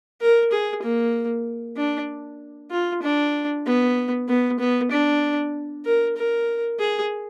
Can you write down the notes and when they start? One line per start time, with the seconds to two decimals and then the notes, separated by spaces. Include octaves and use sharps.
0.21 A#4
0.52 G#4
0.83 A#3
1.77 D4
2.71 F4
3.03 D4
3.66 B3
4.29 B3
4.59 B3
4.92 D4
5.86 A#4
6.17 A#4
6.79 G#4